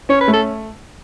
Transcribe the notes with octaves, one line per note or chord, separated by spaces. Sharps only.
C#4 C#5
B4
A3
A4